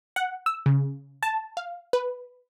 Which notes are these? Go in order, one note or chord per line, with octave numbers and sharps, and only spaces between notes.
F#5
E6
C#3
A5
F5
B4